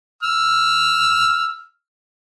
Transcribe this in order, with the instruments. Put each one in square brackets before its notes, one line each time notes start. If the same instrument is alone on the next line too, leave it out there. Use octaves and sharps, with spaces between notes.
[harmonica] E6 F6